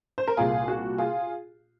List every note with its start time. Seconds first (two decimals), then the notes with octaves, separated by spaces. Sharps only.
0.18 C5
0.28 A#4
0.37 C2 A#2 F4 G#4
0.68 F#4
0.98 F4 G#4